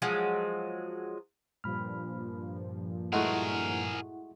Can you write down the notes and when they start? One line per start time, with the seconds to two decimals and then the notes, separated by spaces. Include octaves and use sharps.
0.02 F3 F#3 G#3
1.64 G2 A#2 F3 B5 F6
3.13 G#3 A3 E4 F#4 G#4 A#4 F#5